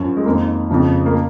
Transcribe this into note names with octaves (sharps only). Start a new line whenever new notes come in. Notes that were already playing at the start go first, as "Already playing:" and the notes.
Already playing: F#2 F3 C#4
G#3
F2 D#3 A#3
F2 C#3 F3
A#3